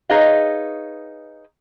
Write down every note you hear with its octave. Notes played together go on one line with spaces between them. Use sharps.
D#4 G#4 B4 C#5 D#5 F5